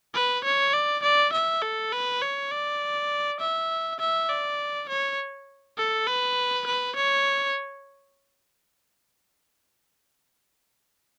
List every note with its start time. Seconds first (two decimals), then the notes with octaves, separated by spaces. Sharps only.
0.14 B4
0.44 C#5
0.74 D5
1.03 D5
1.33 E5
1.62 A4
1.92 B4
2.22 C#5
2.51 D5
3.40 E5
4.00 E5
4.29 D5
4.89 C#5
5.78 A4
6.07 B4
6.67 B4
6.96 C#5